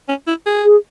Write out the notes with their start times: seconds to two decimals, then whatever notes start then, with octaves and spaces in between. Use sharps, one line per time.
0.09 C#4
0.27 E4
0.46 G#4
0.65 G#4